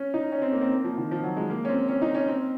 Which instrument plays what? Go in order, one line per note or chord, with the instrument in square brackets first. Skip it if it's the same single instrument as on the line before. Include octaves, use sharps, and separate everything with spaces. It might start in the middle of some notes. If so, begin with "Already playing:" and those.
Already playing: [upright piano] C#4
D#4
C#4
C4
A#3
C4
A#3
F3
D#3
F3
F#3
G#3
A#3
C#4
C4
C#4
D#4
C#4
C4